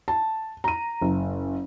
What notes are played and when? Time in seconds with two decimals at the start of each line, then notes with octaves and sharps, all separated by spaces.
0.08 A5
0.64 A#5 D#7
1.01 F#1